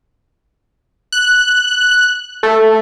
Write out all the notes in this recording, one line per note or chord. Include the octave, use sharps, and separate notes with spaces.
F#6
A3